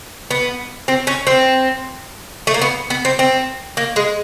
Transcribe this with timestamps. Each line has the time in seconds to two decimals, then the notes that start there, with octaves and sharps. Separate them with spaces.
0.31 B3
0.88 C4
1.07 C#4
1.27 C4
2.47 A3
2.54 A#3
2.62 B3
2.90 B3
3.05 C4
3.19 C4
3.77 A#3
3.96 G#3